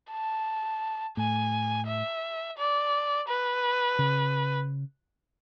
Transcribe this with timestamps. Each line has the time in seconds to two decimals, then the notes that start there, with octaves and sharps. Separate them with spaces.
0.11 A5
1.17 A2 G#5
1.87 E5
2.58 D5
3.28 B4
3.99 C#3